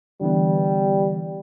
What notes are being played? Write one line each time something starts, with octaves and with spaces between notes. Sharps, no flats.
D3 E3 G3 B3